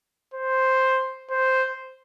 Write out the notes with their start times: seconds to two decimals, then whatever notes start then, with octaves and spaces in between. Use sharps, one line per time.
0.34 C5
1.31 C5